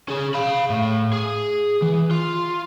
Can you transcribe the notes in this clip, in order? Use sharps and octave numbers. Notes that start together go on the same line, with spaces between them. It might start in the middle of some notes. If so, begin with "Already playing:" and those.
C#4 G#4
F5 B5
A2
G#4
E3
F4